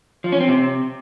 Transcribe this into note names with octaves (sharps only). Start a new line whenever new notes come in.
F3
C#4
C4
C3